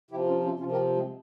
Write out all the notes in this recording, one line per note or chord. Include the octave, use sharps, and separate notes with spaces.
C3 F3 E4 G4
C#4 F4
C#4 F4
C3 F3 C#4 F4
G4 A#4
G#3 C4